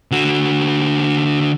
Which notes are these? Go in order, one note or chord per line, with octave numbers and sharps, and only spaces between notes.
D3 F#4